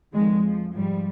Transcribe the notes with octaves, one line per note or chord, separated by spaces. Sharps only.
F2 D#3 G#3
F3
G#2 F3 G3